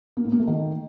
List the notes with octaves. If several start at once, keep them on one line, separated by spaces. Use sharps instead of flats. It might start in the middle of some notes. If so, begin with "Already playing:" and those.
A#3
A2
A#3
A3
D#3